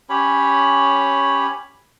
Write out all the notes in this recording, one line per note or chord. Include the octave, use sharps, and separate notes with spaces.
C#4 G4 C#5 B5